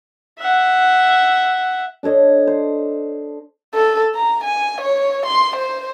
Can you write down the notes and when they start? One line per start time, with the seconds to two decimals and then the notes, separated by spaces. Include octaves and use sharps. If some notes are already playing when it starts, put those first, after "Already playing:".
0.39 E5 F#5
2.03 D4 A4 C#5 D#5
2.47 C5
3.74 A4
4.15 A#5
4.44 G#5
4.81 C#5
5.26 C6
5.56 C5